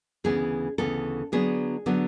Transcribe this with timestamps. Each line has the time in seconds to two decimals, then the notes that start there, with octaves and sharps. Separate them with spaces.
0.24 D2 C#3 E3 B3 G#4
0.78 D2 C#3 E3 B3 A4
1.32 D3 F#3 B3 D4 G#4
1.86 D3 F#3 B3 D4